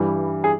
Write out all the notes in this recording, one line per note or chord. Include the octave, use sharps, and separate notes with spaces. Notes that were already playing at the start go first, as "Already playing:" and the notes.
Already playing: G2 E3 G3
G#4